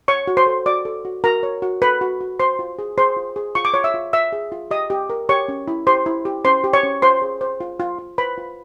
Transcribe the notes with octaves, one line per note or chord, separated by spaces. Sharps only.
C#5 C#6
F#4
C5 C6
A4
F#4 D5 D6
A4
F#4
F#4 A#4 A#5
C#5
F#4
A4 B4 B5
F#4
F#4
C5 C6
F4
G#4
G#4 C5 C6
F4
G#4
F4 C#6
D6
F4 C#5 C#6
E5 E6
F4
F4 E5 E6
G#4
F4
G4 D#5 D#6
G4
A#4
G4 C#5 C#6
C#4
E4
G4 C5 C6
E4
G4
C#4 C5 C6
G4
C#5 C#6
C#4
F4 C5 C6
G#4
C5
F4
F4
F4
B4 C5 B5
F4